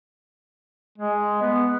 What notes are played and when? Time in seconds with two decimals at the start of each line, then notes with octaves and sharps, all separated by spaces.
0.98 G#3
1.42 B3